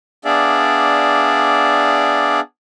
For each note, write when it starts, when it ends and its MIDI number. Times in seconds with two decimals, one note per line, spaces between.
0.25 2.40 59
0.25 2.40 62
0.25 2.40 68
0.25 2.40 74
0.25 2.40 76
0.25 2.40 77